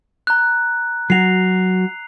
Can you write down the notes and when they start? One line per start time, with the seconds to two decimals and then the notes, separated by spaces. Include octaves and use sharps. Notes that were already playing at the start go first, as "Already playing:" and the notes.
0.27 A#5 F#6
1.10 F#3 F#4 C7 F7